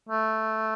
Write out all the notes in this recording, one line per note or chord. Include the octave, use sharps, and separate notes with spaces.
A3